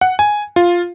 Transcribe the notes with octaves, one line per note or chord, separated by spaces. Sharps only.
F#5
G#5
F4